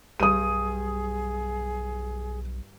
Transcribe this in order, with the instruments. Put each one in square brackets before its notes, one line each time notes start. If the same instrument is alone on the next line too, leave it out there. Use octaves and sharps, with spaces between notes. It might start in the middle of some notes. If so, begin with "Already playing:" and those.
[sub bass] B1 [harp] G2 [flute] G#4 [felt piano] D#6 D#7